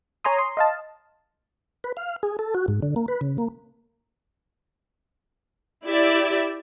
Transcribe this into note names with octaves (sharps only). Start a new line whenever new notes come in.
C#5 G#5 A#5 C6 D#6
C6
D#5 F5 A5
B4
F5
G#4
A4
F#4
G#2
D3
A#3
B4
C#3
A#3
E4 G4 D5 E5